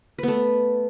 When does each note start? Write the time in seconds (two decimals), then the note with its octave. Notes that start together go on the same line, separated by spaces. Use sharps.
0.19 B4
0.23 B3
0.28 A3